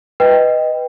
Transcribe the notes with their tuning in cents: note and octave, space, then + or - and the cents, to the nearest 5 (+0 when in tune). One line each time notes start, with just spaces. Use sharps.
B4 +0 D#5 +0 G5 +5